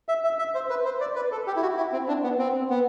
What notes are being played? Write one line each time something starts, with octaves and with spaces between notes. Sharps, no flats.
E5
E5
E5
C5
B4
C5
D5
B4
A4
G4
E4
F#4
E4
C4
D4
B3
C4
B3